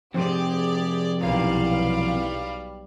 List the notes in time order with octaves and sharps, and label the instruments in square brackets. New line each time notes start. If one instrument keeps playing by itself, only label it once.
[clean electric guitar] F2 C3 [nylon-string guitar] C4 C5 [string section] G4 G#4 D5
[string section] B1 G3 F5 [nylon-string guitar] E2 A#2